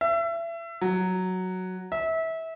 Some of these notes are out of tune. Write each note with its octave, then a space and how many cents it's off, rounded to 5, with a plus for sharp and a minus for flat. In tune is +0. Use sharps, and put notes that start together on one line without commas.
E5 +30
F#3 +0
E5 -25